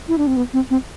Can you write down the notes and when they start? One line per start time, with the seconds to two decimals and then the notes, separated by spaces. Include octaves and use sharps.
0.08 E4
0.18 D4
0.27 C4
0.36 B3
0.53 C4
0.70 C4